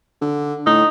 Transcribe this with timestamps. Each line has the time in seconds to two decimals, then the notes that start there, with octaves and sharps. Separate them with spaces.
0.22 D3
0.66 A2 D#4